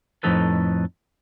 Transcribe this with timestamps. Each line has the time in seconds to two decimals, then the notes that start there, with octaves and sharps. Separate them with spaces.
0.23 F2 A2 F3 D#4 A4 B4